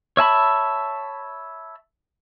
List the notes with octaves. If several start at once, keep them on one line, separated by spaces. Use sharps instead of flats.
C#5 E5 A5 B5